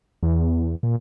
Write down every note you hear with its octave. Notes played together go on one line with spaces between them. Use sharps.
E2
A#2